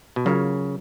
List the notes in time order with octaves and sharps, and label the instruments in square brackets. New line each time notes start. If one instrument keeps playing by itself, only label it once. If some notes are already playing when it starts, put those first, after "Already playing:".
[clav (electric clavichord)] B2
[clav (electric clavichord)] C#3 [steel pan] F#3 C#4 F4 A#4 C#5